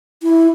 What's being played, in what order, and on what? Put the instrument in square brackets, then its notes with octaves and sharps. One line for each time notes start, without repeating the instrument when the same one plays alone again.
[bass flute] E4